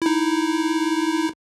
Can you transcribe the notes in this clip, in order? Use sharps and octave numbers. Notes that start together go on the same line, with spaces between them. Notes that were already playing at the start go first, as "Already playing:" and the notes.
D#4 E4